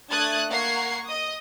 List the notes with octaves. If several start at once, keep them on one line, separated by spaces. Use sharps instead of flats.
A3 D4 D#6 F#6 G#6 A6
A#3 A#4 F#5 C#6 G#6 C7
D#5 D#6